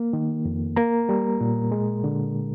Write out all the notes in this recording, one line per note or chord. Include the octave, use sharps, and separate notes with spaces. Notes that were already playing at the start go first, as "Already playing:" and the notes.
Already playing: A#3
D#3
F2
A#3 A#4 A#5
G3
A#2
G#3
D3